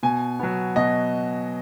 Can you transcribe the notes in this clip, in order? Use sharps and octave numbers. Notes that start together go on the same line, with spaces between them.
B2 G#5
F#3 B3
B2 D#5